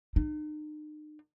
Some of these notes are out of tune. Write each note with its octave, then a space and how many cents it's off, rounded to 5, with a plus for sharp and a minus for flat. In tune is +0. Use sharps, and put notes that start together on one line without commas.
D#4 -40